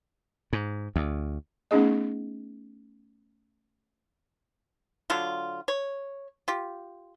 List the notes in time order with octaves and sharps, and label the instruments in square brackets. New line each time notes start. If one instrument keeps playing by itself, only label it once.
[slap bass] G#2
D2
[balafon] A3 B3 C#4 D#4 G#4 D#5
[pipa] D3 F#3 F4
C#5
F4 G4